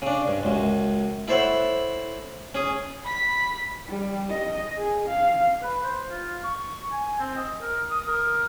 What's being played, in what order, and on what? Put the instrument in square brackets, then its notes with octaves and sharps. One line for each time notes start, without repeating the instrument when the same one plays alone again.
[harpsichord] C#3 D4
G2
C#2 F#2
E4 A4 C5 C#5 E5 F#5
C#4 G#4 D#6
[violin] B5 B6
[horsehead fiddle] G3
D#5
G#4
F5
[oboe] B4
C5
F4
C#6
G#5
C4
D#5
A#4
D#6
A#4